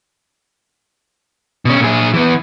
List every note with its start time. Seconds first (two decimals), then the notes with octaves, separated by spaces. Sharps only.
1.65 B2 C#4
1.80 A#2 G#4
2.14 E3 B3